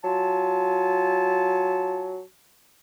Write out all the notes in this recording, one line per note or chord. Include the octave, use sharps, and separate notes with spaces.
F#3 F4 G#5 A5